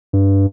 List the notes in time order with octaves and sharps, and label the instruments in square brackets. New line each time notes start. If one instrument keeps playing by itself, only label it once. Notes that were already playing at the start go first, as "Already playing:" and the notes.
[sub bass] G2